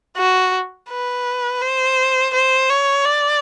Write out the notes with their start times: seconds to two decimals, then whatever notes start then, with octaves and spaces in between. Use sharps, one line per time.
0.17 F#4
0.89 B4
1.62 C5
2.33 C5
2.69 C#5
3.05 D5